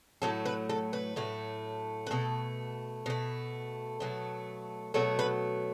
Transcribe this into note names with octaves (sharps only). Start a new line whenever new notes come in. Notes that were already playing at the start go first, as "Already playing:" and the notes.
A2 F#3 A3 A4
B4
A4
B4
A2 F#3 A3
B4
B2 A3 A4
B2 A3
B2 F#3 A3
B2 F#3 A3 A4
B4